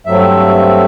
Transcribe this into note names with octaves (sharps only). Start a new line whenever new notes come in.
G2 F#3 A3 C4 E5